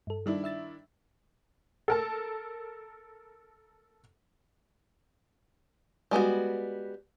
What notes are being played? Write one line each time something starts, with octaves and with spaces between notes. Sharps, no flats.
G2 A4
D#3 G3 D4 E4
E5 E6 A6
A4 A#4 A5
G3 G#3 B3 F#4